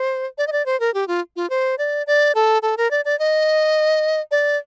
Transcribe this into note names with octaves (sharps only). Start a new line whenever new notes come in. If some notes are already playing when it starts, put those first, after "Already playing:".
Already playing: C5
D5
D#5
D5
C5
A#4
G4
F4
F4
C5
D5
D5
A4
A4
A#4
D5
D5
D#5
D5